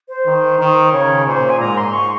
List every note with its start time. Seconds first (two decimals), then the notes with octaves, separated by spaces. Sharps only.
0.09 C5
0.26 D#3
0.59 D#3
0.92 C#3 C#5
1.27 A#2 C5
1.50 G#5
1.60 G#2 A#5
1.77 C6
1.94 C#6